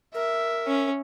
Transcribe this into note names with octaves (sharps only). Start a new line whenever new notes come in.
A#4 E5
C#4